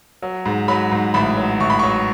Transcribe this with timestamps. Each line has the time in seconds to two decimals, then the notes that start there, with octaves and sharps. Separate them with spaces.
0.22 F#3
0.46 G#2
0.68 F#3 B5
0.91 G#2
1.14 A1 B5
1.37 F#3
1.60 A1 C#6
1.70 B5
1.79 C#6
1.83 F#3